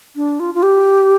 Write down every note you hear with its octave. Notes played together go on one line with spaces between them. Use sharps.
D4
F4
F4
G4